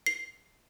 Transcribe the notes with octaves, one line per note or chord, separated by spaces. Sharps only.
C7